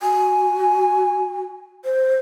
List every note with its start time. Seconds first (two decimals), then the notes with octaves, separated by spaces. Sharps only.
0.01 F#4 G#5
1.85 C5